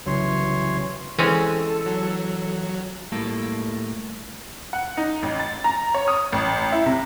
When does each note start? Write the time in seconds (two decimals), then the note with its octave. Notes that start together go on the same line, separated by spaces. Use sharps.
0.06 C2 C#3 E3 F#3 C#5 C6
1.18 E3 G#3 C4 C#4 A4
1.86 F#3
3.12 A2 G3 A#3 A4
4.73 F#5
4.97 D#4
5.23 A1
5.40 A6
5.64 A#5
5.94 C#5
6.08 D#6
6.32 A1
6.72 E4
6.86 C3